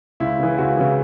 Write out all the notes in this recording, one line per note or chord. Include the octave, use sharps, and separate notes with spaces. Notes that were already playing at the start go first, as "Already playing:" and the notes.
C#2 E4
C#3 E3
C#2 F#4
C#3 E3